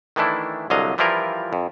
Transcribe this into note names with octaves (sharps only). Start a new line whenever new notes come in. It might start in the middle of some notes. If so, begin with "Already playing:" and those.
D#3 E3 A3 D4 E4
C2 D3 F#3 D#5 F5
E3 F3 G3 E4 F4 A#4
F2